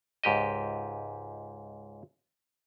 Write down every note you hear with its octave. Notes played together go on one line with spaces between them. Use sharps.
C#2 G#2 G4 D#5